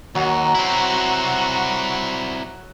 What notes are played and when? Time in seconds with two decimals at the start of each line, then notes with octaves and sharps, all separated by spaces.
0.15 D#2 F#3 F#4 A#5
0.55 C4 E4